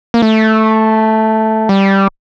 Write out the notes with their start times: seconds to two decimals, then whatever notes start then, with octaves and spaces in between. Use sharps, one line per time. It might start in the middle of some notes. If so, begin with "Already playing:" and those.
0.14 A#3
0.22 A3
1.69 G3